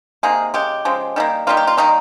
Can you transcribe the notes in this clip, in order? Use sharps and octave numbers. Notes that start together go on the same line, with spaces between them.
C3 D#3 A#3 G#4
C#3 G#3 G4
C#3 F3 G#3
D#3 G3 A#3
D#3 G3 A#3 F4
G4
F4
D#3 G3 A#3 D#4